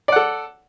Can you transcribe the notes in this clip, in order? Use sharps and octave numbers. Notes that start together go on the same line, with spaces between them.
A4 D5 F#5